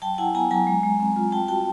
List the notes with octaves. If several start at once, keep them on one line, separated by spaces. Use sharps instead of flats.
F#3 G5 A5
E4 F#5 G#5
B3 G#5 A#5
F#3 G#5 A#5
G#3
G#3
C4
F4
G3 G5 A5
F#4 G5 A5